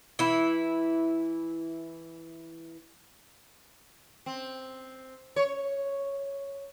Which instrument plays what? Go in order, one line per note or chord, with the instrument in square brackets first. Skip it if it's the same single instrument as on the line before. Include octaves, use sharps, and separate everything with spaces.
[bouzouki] E3 E4
[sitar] C4
C#5